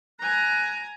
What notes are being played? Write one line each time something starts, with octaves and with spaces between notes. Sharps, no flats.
G#5 A#5 F#6